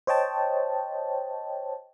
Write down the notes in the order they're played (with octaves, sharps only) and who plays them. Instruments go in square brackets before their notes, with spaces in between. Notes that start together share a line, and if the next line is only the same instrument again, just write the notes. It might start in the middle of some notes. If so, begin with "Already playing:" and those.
[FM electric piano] C5 C#5 D#5 G5 A5